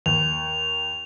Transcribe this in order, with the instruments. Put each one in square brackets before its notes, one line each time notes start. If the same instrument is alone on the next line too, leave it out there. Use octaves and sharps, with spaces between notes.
[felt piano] D#2 [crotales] F7